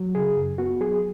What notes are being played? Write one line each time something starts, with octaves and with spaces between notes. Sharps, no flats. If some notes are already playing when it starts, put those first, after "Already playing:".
Already playing: F#3
C#3 G#4
F#2
B3 F#4
F#3 G#4